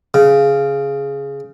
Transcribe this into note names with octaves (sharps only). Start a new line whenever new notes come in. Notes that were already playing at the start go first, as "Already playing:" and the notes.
C#3